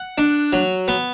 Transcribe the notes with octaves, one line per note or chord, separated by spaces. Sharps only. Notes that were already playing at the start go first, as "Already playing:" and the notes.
Already playing: F#5
D4
F#3
B3